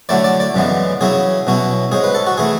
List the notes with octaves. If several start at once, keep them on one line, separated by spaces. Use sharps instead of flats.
D3 F#3 A3 E4 D5
D5
D5
F#2 C#3 E3 G#3 B3
C#3 F#3 C#4 E4 G#4
B2 F#3 C#4 E4
G#2 G#3 C#4 G#4
B4
A4
F#4
E3 A3 E4 G#4